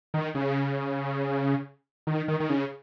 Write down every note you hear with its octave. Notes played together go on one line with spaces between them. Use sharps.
D#3
C#3
D#3
D#3
D#3
C#3